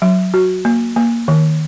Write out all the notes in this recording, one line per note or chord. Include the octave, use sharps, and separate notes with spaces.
F#3
F#4
A#3
A#3
D#3